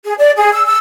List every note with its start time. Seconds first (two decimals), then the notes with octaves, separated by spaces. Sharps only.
0.05 G#4
0.18 D5
0.36 G#4
0.53 E6
0.66 E6